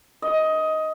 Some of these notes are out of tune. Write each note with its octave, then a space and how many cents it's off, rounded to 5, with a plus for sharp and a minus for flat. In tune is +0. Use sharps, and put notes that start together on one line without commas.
D#5 +15